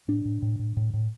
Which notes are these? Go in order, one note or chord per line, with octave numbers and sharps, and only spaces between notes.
A2 D4
A2
A2
A2
A2
A2